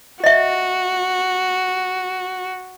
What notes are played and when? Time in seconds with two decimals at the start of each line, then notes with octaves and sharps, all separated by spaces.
0.24 F#4 D#5 E5